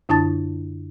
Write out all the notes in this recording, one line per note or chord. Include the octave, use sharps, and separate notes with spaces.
F#2 D3 D4 E4 A5 A6